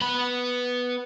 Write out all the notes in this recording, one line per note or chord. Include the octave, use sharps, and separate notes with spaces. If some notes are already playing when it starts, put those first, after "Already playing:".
B3 B5